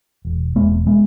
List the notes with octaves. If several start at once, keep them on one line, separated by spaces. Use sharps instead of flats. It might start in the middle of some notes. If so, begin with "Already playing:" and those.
E1
E1 G#3 B3
G#3 B3